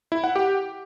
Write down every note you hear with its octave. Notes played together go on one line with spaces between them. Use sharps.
E4
F#5
G4